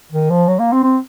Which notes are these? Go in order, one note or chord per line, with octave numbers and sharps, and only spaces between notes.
D#3
F3
F#3
A#3
C4
C4